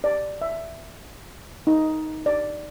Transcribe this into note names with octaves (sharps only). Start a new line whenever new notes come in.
D5
E5
D#4
D5